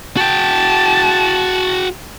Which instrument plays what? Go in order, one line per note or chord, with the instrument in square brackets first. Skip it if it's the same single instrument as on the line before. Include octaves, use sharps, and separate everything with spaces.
[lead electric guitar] F#4 G5 [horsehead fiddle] A5